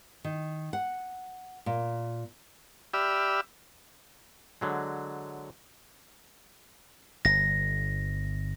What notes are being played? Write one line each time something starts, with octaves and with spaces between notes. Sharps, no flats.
D#3
F#5
A#2
G4 D5 E5 B5 E6 F6
D3 F#3 G#3
G1 A#6